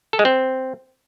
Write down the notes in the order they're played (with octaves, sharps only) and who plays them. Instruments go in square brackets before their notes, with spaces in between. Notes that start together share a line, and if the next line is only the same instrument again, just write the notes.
[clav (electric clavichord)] A4
G#3
C4